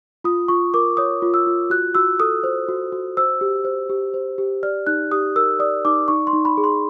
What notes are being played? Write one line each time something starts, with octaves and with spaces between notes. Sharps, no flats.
F4 D#6
F4 C#6
A#4 D6
C#5 D#6
F4
E6
F4
F#4 F#6
F#4 E6
A4 D#6
C5
F#4
F#4
C5 E6
G4
C5
G4
C5
G4
D5 F6
D#4 F#6
G4 D#6
A#4 E6
D5 D#6
D#4 D6
D#4 C#6
C6
D#4
B5
G#4
C6